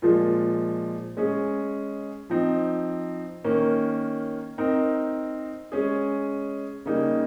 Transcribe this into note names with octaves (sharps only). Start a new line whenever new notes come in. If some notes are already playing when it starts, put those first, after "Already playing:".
A#2 F3 G#3
G#3 C#4 G#4
F3 C4 D#4
D#3 A#3 C#4
C4 D#4 A#4
G#3 C#4 G#4
C#3 G3 A#3 D#4